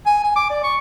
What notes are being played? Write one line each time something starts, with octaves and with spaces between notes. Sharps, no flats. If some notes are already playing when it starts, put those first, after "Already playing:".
G#5
G#5
D6
D5
C#6